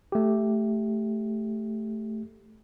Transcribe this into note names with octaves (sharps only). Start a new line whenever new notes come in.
A3 G4